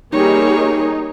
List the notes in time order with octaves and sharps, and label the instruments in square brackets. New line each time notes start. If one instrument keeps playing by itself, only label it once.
[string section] G3 A#3 [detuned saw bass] D#4 [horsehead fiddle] G#4 C#5